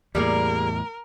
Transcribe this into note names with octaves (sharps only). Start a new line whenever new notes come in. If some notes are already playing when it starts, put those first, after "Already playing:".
E2 A2 G3 A#3 G#4 A#4